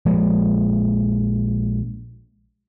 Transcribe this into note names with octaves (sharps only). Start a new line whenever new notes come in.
A#1 F3 G#3